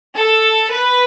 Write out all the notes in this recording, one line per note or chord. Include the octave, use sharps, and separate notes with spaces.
A4
B4